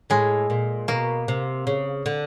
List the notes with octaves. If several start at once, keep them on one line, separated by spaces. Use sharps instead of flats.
A2 G#3
A#2
B2 A#3
C3
C#3
D3